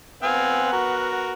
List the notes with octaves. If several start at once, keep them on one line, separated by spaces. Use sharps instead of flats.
B3 C4 F5 G#5 F#6
F#4 A#4